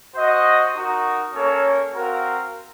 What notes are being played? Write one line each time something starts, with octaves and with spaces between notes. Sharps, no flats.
F#4 C5 D#5
D#4 F#4 A#4
A#3 C#4 A4 C#5
C4 F#4 A#4 F5